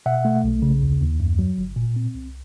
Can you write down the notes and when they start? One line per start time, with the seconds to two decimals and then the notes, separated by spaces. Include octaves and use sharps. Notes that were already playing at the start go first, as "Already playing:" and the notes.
0.06 B2 E5 F#5
0.25 A3
0.44 B1
0.62 C#3
0.82 D#2
1.01 D#2
1.20 F#2
1.39 F#3
1.58 G1
1.76 A#2
1.96 C4
2.14 C2